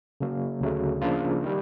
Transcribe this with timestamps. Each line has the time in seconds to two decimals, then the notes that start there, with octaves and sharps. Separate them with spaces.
0.20 C#3 F#3 A#3
0.61 D2 C#3 F#3 A3
1.02 C#3 F3 A#3 D4 F4
1.44 D#3 G3